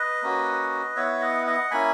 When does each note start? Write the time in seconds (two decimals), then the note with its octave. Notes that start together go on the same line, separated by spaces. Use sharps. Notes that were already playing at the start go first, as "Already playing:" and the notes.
Already playing: B4 D#5
0.22 A#3 C#4 F#4
0.96 B3 E4 C#5 E5
1.21 D#5 F#5
1.46 D#5 F#5
1.71 A#3 C#4 E4 G#5 B5